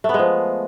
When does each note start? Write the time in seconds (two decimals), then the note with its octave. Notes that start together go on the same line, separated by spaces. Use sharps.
0.04 A3
0.09 B3
0.14 G#3
0.19 F3